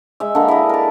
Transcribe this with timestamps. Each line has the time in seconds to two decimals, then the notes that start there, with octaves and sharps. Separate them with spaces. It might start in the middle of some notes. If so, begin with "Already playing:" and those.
0.20 G#3 E5
0.35 D3 A#3
0.48 E4 D#5
0.69 A#4 A5